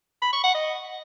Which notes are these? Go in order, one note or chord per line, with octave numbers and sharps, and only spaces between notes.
B5
C#6
F#5
D#5